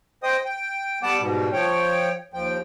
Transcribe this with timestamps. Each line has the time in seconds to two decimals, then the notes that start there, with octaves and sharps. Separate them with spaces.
0.23 C5 D#5 G5 D#6
0.45 G5
1.03 G3 B3 F#5 A5 D6
1.20 G#2 B2 G3
1.53 F3 C#5 G5
2.34 D#2 F3 G5